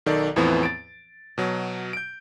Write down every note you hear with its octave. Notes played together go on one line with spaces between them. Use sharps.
B1 D#3 A4 D5
E2 A2 E3 F3 B3 C4
A6 D7
B2 F#3
G6 D7